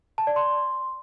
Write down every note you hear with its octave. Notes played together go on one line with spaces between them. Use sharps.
A5
D5
C6